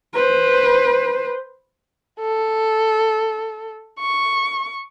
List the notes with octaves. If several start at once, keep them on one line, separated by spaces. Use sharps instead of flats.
B4 C5
A4
C#6